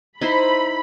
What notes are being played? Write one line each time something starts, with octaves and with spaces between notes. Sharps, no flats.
D#4 E4 C5 B5